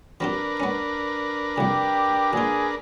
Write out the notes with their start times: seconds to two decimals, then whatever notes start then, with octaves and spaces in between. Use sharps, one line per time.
0.20 F3 C4 D4 G4 A#4 B4
0.60 B3 C#4
1.58 C2 F2 G4
2.33 A#1 F4 G#4